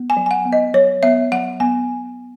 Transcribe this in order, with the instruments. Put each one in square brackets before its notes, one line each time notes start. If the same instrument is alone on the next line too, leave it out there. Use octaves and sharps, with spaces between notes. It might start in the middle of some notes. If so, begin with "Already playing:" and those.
Already playing: [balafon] B3
G#5
F#3
G#5
F#5
B3
D#5
F#3 C#5
B3 E5
F#3 F#5
B3 G#5